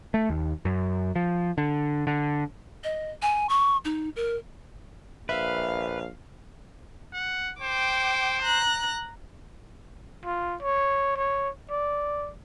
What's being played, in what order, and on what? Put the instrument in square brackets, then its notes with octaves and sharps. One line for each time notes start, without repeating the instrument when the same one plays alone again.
[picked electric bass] A3
D#2
F#2
F3
D3
D3
[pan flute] D#5
G#5
C#6
D#4
A#4
[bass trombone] A#1 [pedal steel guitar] B4 [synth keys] E5 [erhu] F5
[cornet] F#5
[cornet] C5 [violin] G5 D6
[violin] A#5 F#6
[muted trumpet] F4
C#5
C#5
D5